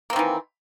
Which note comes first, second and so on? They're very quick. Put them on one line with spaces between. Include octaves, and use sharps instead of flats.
A#3 C4 D#3 E3